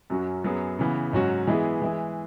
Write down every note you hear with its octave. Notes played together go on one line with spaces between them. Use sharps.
F#2 F#3 C#4 F#4
F#2 F#3 B3 G#4
C#3 E3 B3
G#2 F#3 C#4 F#4
E3 G#3 B3 E4 G#4
E3 G#3 E4 G#4